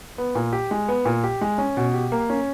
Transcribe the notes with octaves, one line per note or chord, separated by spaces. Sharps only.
B3
A#2
G4
G#3
B3
A#2
G4
G#3
C#4
B2
G4
A#3
C#4